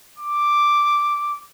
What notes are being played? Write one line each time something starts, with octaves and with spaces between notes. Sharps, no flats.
D6